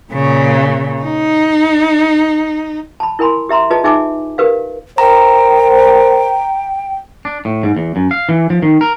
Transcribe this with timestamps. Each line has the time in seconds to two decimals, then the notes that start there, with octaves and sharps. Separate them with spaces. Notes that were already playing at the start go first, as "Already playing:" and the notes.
0.13 A#2 C#3
1.03 D#4
3.00 A5 B5
3.19 E4 A#4 G#5 B5 C6
3.49 G4 E5 A#5 C6
3.70 F4 G#4 B4 D#5 A5
3.84 D#4 G#4 E5 G#5 A5 D6
4.38 G4 A#4 B4 F5
4.98 A#4 C5 G5 A#5
7.25 D4
7.45 A2
7.63 G#2
7.77 E2
7.96 F#2
8.11 F5
8.29 E3
8.50 F3
8.62 D#3
8.81 A#4